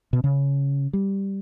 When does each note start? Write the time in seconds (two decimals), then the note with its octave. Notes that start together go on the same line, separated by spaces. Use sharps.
0.13 B2
0.24 C#3
0.93 G3